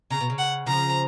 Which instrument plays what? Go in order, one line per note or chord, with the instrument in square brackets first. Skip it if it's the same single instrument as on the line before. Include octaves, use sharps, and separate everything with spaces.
[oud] C#3 [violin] A#5
[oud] B2
C#3
[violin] F#5
[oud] C#3 F3 [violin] A#5